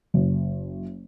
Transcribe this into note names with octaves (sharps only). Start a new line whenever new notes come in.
F#1